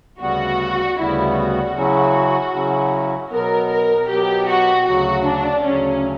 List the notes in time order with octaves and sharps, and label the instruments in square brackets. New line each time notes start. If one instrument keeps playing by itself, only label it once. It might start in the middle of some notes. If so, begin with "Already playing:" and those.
[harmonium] D2 C#3 G3 B3 [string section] F#4
[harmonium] D2 C#3 G3 B3 [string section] E4
[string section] F#4
[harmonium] C#3 F#3 C#4 E4
C#3 F#3 C#4 E4
[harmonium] B2 F#3 B3 [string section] A#4
[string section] A#4
[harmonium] B2 F#3 B3 [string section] G4
[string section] F#4
[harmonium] D2 C#3 F#3 [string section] F#4
[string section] D4
[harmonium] D2 C#3 F#3 [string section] C#4